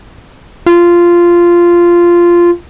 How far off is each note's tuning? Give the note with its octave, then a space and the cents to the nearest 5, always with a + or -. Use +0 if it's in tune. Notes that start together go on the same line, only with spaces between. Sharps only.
F4 -10